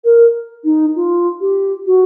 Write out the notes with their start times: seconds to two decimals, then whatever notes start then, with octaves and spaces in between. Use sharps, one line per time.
0.04 A#4
0.65 D#4
0.96 F4
1.41 G4
1.87 F#4